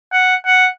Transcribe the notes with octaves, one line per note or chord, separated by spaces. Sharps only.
F#5
F#5